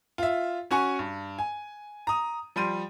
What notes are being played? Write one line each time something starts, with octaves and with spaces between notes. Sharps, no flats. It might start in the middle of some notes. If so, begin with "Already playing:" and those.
F4 E5
C#4 F#4 G#5 C#6
G2
G#5
A#5 D#6
F3 G3 C6 D#7